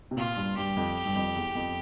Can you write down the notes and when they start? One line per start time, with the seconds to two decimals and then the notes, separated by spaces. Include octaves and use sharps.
0.11 C3
0.17 A#2 F4
0.37 G2
0.57 G2 G4
0.77 F2
1.06 G2
1.16 F2
1.36 E2
1.55 F2